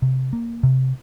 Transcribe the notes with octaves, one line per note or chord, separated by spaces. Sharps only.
C3
A#3
C3